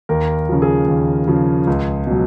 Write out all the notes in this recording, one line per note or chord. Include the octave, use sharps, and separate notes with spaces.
D#2 A#4
C#3 F3
G#4
D#2
C#3 F3
C#2
B2 F#3